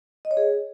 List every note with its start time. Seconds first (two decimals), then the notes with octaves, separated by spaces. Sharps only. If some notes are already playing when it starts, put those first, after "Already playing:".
0.25 D#5
0.31 C#5
0.37 G#4